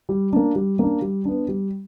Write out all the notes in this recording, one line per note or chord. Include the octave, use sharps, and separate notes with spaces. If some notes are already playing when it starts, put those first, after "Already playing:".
G3
A#3 D4
G3
A#3 D4
G3
B3 D4
G3